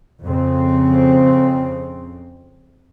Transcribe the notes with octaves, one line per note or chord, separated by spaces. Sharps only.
F2 C#3 C4